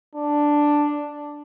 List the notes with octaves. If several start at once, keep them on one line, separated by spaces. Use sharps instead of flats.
D4